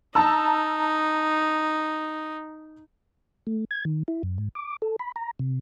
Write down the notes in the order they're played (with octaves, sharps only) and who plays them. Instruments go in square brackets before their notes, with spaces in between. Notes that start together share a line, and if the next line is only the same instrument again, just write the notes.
[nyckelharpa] D#4 [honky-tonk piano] A5 A#5 E6
[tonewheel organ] A3
G#6
D#3
E4
F#2
G#2
D6
A4
B5
A#5
C3